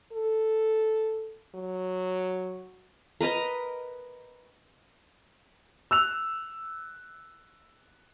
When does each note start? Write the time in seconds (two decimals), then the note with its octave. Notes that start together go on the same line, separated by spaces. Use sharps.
0.13 A4
1.55 F#3
3.21 A#4 B4 D#5 A#5
5.91 E6 F#6 F7